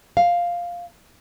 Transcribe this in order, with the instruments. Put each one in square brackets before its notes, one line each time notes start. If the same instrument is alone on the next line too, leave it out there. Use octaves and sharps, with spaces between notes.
[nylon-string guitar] F5